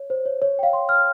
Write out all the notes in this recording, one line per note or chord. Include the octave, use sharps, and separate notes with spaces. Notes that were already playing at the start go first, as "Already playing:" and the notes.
Already playing: C#5
C5
C#5
C#5
G5
F5
C6
F6